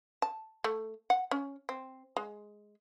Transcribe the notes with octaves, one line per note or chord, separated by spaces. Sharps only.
A5
A3
F#5
C#4
C4
G#3